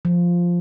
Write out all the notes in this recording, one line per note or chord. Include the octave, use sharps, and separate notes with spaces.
F3